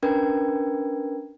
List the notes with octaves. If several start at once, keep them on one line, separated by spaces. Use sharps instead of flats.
C#4 D4 A#4 B4 G5 G#6